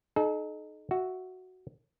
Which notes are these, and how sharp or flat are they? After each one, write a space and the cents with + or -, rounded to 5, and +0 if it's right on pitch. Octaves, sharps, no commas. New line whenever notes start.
D#4 -15 A4 -45
F#4 +0 E5 +0